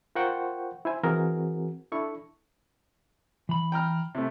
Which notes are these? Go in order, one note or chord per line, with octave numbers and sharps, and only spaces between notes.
F4 A#4 C5 F#5 G5 C#6
E4 C5 G#5
E3 C4 F#4 G#4 A#4
D4 E4 A4 C#6
E3 B5
G5 A#5 F6
C3 A3